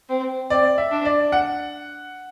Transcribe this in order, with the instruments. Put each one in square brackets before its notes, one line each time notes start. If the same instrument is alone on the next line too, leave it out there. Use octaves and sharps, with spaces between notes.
[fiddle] C4
[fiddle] C4 [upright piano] D5
[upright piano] E5
[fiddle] D4
[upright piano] D5
F#5